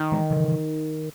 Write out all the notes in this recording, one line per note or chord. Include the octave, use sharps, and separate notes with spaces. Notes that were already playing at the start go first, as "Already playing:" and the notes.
Already playing: D#3
E3 G#3
C#3 E3